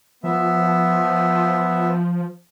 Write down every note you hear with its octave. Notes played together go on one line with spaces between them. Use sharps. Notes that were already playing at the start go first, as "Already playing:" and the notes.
F3 B3 E5